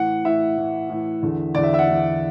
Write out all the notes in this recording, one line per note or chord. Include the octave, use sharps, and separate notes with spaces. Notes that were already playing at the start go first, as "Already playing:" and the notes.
Already playing: A2 E3 F#5
A2 E3 E5
A2 E3
A2 E3
E2 D3
E2 D3 D5
E5
E5
F#5
E2 D3